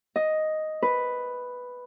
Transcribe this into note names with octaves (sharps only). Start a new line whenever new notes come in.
D#5
B4